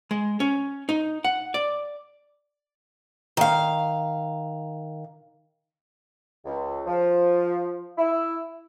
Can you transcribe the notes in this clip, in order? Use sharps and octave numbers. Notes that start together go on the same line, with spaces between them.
G#3
C#4
D#4
F#5
D5
D#3 F5
C#2
F3
E4